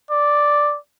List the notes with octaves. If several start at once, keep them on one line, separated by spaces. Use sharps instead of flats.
D5